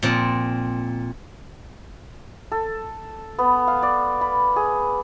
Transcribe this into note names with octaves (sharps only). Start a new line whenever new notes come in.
A#2 F3 C4
A4
B3
F5
D5
B5
G#4